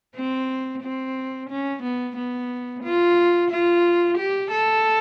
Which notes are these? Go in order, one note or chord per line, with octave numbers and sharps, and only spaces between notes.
C4
C4
C#4
B3
B3
F4
F4
G4
A4